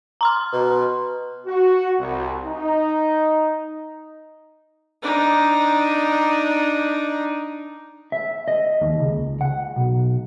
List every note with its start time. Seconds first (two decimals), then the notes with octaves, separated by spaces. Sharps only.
0.21 A#5 C6 F6
0.53 B2
1.46 F#4
1.99 C2
2.46 D#4
5.02 D4 D#4
8.12 E5
8.48 D#5
8.81 D#2
9.00 C#2
9.41 F#5
9.76 B1